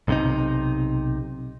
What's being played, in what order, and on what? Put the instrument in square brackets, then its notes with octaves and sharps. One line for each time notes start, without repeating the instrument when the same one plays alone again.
[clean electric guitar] B1 C3 D#4